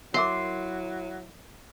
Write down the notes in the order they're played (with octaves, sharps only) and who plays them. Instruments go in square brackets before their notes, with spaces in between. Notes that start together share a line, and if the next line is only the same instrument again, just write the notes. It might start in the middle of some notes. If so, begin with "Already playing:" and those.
[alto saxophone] F#3 [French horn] E4 [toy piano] A#4 E5 D6 [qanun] C6